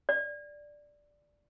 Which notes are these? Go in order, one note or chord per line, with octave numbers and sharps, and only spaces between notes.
D5